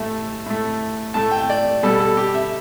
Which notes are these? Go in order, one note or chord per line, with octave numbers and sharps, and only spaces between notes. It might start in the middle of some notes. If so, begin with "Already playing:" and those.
Already playing: A2 A3 E5
A2 A3
A2 A3 A5
G5
D5
B2 G3 A4
A4
G4
E5